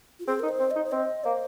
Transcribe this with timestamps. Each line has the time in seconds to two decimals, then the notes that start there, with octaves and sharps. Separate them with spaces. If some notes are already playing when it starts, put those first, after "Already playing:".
0.19 F4
0.27 C4 G#4
0.39 D#4 A#4
0.49 C5
0.60 C4
0.71 D#4 D#5
0.84 C5
0.92 C4 D#5
1.24 A#3 C5